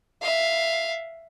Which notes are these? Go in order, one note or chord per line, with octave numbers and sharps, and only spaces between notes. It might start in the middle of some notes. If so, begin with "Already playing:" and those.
E5 F5